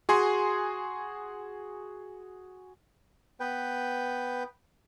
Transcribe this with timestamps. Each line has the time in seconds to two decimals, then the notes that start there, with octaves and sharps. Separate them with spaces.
0.09 F#4 G#4 G#5 C6
3.40 B3 B4 G5